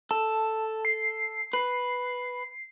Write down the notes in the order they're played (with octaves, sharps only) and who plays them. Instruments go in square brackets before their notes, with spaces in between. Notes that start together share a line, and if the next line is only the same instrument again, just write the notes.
[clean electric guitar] A4 [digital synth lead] A5
[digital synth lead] C7
[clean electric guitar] B4